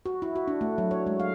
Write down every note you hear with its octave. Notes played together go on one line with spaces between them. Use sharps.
F#4
E4
F#4
D4
A3
F#3
C#5
G#3
F5